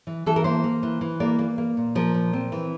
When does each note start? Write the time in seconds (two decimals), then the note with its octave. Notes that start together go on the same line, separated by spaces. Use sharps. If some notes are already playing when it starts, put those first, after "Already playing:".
0.07 E3
0.26 E3 A4
0.36 A#4
0.44 A#3 C5
0.64 A#3
0.83 E3
1.01 E3
1.20 A#3 D5
1.39 A#3
1.58 A#3
1.77 A#2
1.95 F3 A#4
2.14 A#2
2.33 C4
2.52 E3